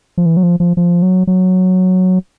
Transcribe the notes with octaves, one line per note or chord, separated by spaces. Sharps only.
F3
E3
F#3
F3
F3
F3
F#3
F#3